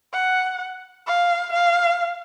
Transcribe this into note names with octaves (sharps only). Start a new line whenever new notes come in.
F#5
F5
F5